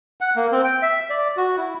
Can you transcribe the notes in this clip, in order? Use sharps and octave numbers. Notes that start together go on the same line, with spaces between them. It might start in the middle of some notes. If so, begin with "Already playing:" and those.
F#5
A#3
C4
G5
E5
D5
F#4
E4